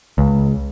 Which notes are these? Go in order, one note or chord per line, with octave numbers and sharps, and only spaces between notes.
C#2